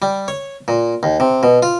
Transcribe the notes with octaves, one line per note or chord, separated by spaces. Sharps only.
G3
C#5
A#2
D#2
C3
B2
F4